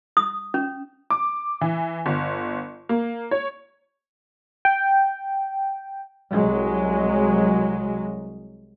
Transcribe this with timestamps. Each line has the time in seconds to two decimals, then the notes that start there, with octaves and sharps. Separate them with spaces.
0.17 D#6
0.54 C#4
1.10 D6
1.61 E3
2.06 G1
2.89 A#3
3.31 C#5
4.65 G5
6.32 C2 F#3 G#3